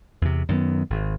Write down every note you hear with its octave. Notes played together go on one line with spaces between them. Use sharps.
E2 C3
F#2 D#3 G#3 B3
G#1